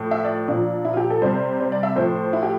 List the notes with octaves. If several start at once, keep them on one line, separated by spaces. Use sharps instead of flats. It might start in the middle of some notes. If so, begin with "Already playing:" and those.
Already playing: A2 F3
E5
D5
A#2 F3 D4
E4
F4
G4
A4
C3 G3 C5
C5
D5
E5
A2 F3 C5
E4
G4